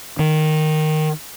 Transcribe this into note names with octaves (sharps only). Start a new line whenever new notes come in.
D#3